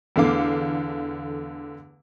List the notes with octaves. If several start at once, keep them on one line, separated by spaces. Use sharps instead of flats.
E2 D3 A3 F5 D6